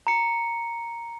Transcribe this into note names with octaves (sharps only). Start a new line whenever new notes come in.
A#5 C#7